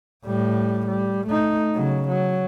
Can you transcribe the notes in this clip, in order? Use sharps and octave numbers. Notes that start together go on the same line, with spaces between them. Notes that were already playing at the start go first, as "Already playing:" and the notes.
A2 G3
G3
A3 D#4
C#3 F#3
F#3